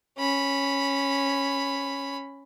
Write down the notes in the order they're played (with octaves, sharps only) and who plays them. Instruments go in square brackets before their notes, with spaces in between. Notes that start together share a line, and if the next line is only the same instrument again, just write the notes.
[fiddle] C#4 B5